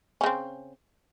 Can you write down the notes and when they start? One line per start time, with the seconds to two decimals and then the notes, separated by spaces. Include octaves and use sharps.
0.21 C#4
0.24 C#3
0.26 C4